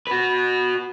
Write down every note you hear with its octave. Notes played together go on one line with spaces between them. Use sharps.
F#4 B4